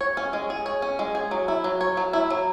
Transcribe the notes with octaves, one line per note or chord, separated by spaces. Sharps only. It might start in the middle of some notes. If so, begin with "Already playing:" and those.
C#5
C#4
G#3
G#4
C#5
C#4
G#3
G#4
F#3
E4
F#3
C#5
F#3
E4
F#3